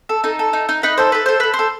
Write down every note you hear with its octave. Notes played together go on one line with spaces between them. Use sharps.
A4
D#4 A4
A4
D#4
D#4
D#4 B4
A4 C5
A4 B4
A4 C5
A4 B4
C5
A4